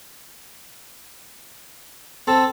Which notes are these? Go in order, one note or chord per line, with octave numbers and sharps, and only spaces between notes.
C4 A4